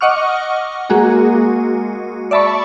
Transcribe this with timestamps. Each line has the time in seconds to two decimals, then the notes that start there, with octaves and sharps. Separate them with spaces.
0.01 D#5 F#5 C#6 D6 F6
0.90 G#3 A#3 F#4 G#4
2.31 D5 E5 A5 B5 C#6